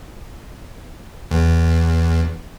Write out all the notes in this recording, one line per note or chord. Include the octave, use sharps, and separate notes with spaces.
E2